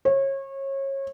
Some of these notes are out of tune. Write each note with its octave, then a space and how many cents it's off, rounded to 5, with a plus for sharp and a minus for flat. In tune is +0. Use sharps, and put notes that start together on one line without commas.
C#5 -30